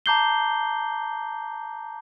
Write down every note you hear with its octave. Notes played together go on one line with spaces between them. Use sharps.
A5 A#5 D6 G6 C7 G7